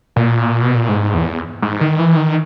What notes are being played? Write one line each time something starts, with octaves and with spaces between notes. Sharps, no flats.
A#2
B2
A#2
G#2
E2
G#2
D#3
E3
D#3